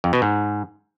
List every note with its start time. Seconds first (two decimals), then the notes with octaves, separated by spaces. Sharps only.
0.04 F2
0.13 B2
0.22 G#2